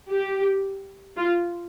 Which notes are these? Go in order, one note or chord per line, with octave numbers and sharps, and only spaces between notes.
G4
F4